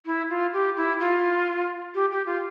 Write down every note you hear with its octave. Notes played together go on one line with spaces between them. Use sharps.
E4
F4
G4
E4
F4
G4
G4
F4